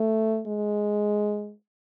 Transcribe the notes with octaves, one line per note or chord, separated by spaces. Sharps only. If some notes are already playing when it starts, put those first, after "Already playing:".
Already playing: A3
G#3